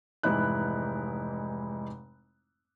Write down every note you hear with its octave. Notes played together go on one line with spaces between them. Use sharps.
F1 G#2 E3 D#4 E4 F#6